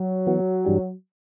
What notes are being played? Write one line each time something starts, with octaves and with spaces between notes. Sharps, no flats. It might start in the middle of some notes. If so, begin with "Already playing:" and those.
Already playing: F#3
E3 B3 F#4
G2 E3 G3 D4 G4